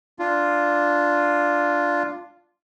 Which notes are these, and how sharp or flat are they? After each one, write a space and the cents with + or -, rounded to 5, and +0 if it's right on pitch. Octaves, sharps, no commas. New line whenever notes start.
D4 +0 F4 +0